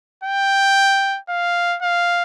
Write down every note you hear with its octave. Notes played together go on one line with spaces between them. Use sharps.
G5
F5
F5